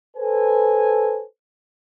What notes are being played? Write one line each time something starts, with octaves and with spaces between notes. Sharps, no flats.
A4 B4 C5 G#5